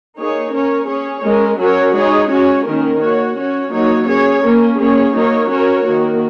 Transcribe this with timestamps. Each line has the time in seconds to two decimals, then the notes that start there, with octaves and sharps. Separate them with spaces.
0.17 A#3 D#4 G#4 C#5
0.52 C#4 A#4 C#5
0.88 C#4 G#4 C#5
1.23 G#3 C#4 A#4
1.58 F#3 C#4 F#4 A#4 C#5
1.94 G#3 D#4 G#4 C#5
2.30 C#4 F#4 C#5
2.65 D#3 A#3 C#4 A#4
3.01 A#3 F#4 C#5
3.36 C#4 F#4 C#5
3.71 F#3 A#3 D#4 F#4 C#5
4.07 C#4 G#4 C#5
4.42 A#3 C#4 A#4
4.78 A#3 C#4 G#4 C#5
5.13 F#3 A#3 D#4 A#4 C#5
5.49 C#4 F#4 A#4 C#5
5.85 D#3 A#3 F#4 A#4